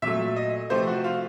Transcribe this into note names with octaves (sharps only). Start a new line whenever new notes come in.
A#2 F#3 A3 E5
D#5
C3 F3 A3 C5
F#4
F4